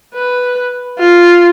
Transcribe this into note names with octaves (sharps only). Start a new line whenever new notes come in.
B4
F4